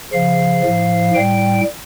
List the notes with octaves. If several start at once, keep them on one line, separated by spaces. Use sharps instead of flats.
C#3 F3 F5
A2 F3
A2 G3 G5